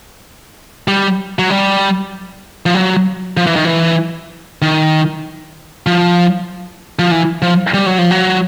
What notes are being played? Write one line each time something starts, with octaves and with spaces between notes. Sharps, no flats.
G3
F#3
G3
F3
F#3
F3
E3
D#3
E3
D#3
F3
F3
E3
F3
G3
F#3
F3
F#3